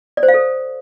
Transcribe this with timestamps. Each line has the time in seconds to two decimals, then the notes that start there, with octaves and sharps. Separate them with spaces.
0.17 D5
0.23 C5
0.28 F5
0.34 A4